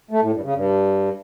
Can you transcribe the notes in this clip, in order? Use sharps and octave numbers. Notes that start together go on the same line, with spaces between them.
A3
A2
G2
C#3
G2